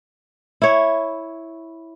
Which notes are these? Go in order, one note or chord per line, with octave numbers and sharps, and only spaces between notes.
E4 C#5